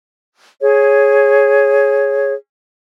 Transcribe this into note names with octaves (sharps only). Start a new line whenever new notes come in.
G#4 C#5